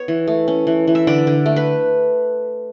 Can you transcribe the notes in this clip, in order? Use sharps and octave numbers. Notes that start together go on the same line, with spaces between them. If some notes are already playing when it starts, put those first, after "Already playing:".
Already playing: B3 C#5
E3
A3
C#4
E3
E3
E5
D3 D5
D3
A3
B4